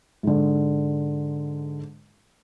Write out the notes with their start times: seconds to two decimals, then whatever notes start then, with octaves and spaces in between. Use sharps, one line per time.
0.23 G#2 D3